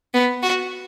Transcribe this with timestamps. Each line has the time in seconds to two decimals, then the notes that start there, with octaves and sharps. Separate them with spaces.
0.14 B3
0.42 F#4